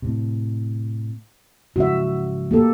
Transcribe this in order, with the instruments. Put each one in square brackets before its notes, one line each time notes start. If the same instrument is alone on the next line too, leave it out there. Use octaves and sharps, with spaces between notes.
[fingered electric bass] A2 C3
[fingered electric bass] G#2 C#3 F3 [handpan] F#4 E5
[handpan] A#3 G4 A4